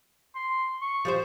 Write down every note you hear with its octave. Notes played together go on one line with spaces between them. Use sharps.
C6
C#6
F3 G4 C5